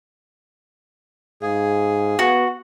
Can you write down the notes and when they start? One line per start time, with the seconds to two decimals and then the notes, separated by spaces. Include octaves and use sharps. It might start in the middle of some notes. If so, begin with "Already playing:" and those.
1.42 G#2 G#4 F5
2.19 B3 F#4